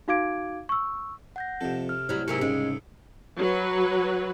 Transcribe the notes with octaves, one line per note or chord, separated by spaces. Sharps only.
D#4 F#4 F5 D6 G#6 D7
C#6 E6
F#5 G6 A#6
F2 C3 A4
F6
A2 F#3 G3 E4 C5
G#2 C3 F#3 A#3 C#4 G4 E6 C#7
C2 G#2 C#3 G#3
F#3 B4